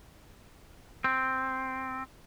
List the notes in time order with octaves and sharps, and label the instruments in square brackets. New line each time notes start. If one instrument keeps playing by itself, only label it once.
[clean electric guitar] C4